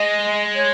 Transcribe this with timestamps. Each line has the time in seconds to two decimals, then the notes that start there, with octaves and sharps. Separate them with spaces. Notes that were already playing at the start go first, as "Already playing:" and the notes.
Already playing: G#3 D#5
0.55 C#5